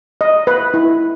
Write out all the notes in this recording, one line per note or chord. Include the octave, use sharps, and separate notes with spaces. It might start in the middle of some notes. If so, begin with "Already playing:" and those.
D#5
B4
E4